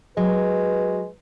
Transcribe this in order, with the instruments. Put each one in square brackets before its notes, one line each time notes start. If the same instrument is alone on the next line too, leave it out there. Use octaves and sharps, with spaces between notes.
[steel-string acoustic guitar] F#3 [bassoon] G#3 [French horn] B4